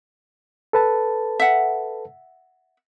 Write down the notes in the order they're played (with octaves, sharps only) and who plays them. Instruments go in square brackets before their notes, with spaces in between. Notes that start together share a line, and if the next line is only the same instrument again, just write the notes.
[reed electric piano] A4 B4 A5
[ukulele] E5 F#5